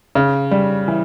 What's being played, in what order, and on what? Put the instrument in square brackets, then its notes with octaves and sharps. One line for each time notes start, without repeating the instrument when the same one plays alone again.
[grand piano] C#3
G3
E3